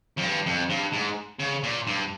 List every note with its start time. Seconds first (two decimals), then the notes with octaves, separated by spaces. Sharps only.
0.17 F2
0.23 G2
0.46 F2
0.70 G2
0.93 G#2
1.40 C#3
1.63 A#2
1.87 G2